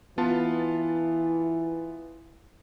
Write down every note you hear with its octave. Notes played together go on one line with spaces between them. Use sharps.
E3 B3 F4 A5